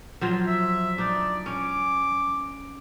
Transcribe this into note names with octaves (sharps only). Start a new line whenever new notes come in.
F3 F#3 F4
E5
D4 D#4 D5
C#4 D6